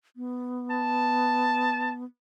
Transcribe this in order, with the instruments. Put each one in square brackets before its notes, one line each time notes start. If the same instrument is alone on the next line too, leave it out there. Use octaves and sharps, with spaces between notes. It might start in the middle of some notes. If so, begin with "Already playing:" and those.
[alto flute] B3
[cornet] A5